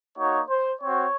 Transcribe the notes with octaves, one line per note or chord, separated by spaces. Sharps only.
A#3 D#4 F#4 C#5
C5
C4 F#4 C#5